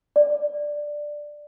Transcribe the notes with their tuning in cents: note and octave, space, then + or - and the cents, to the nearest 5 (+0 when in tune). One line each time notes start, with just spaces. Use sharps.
D5 +10